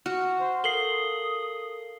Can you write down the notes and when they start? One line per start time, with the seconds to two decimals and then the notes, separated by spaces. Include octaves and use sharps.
0.06 F#4 F6
0.39 C5
0.64 A4 A#4 F5 D#6 C7 F#7 G7